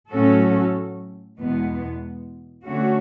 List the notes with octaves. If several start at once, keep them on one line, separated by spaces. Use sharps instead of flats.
A2 F#3 C#4 F#4 A4
E2 B2 G#3 B3
D3 A3 C#4 F#4